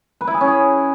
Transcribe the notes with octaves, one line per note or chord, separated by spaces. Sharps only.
B4
E4
G#4
C#4
G#4